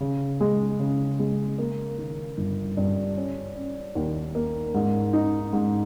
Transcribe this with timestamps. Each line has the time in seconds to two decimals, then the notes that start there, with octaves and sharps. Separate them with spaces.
0.01 C#3
0.40 G#3
0.79 C#3
1.19 G#3
1.58 A#3
1.98 D#3
2.37 G1
2.77 G2
3.17 C#4
3.56 C#4
3.95 D#2
4.35 A#3
4.74 G#2
5.13 D#4
5.53 G#2